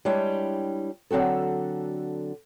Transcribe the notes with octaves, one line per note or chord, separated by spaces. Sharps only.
G3 G#3 D4 E4 C#5 G5
D3 F#3 C4 F#4 A4